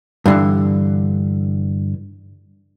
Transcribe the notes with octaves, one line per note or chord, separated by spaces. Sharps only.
G2 D3 E3